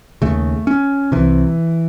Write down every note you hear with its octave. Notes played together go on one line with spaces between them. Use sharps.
D#2 C#3 A3
C#4
C2 C3 E3